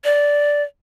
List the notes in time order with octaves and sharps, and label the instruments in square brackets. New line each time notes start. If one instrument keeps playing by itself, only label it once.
[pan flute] D5